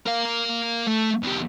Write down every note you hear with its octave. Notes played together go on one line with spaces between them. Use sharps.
A#4 F5
A3
E2 G4